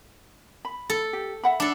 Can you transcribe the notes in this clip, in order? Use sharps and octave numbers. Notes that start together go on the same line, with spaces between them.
B5
A4
G4
E5 F#5 B5
D4 A4